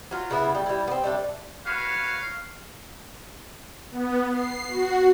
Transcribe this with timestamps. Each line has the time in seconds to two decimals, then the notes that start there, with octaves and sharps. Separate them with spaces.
0.11 F#3 F4
0.31 C#3 B3 E4
0.55 G3
0.66 G3 E4
0.88 B3 C4
1.04 G3 A3 D4
1.66 F#4 B4 C#5 F5
3.90 B3
4.32 C7
4.68 F#4